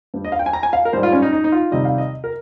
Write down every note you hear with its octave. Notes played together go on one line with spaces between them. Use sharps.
G2 G3
D#5
F5
G5
G#5
A#5
G#5
F5
A#4
G#2 G3 C5
F4
C#4
D#4
D#4
D#4
F4
C3 D#3 G3 D#5
F5
D#5
A#4